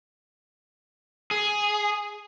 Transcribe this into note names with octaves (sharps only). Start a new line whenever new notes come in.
G#4